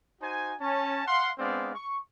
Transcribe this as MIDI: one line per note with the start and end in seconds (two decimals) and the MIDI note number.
0.22 0.53 63
0.22 0.53 66
0.22 0.53 72
0.22 0.53 80
0.60 1.05 61
0.60 1.05 81
1.07 1.30 77
1.07 1.30 78
1.07 1.30 84
1.38 1.73 56
1.38 1.73 59
1.38 1.73 60
1.38 1.73 62
1.38 1.73 74
1.38 1.73 77
1.75 1.99 85